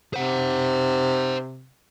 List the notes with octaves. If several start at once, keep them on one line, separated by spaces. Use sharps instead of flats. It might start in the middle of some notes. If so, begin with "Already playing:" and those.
C3 C5 F#5